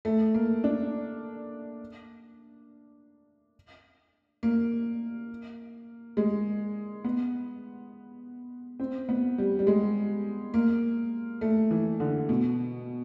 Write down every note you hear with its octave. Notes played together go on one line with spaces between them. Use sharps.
A3
A#3
D4
A#3
G#3
B3
C4
B3
G3
G3
G#3
A#3
A3
E3
D3
B2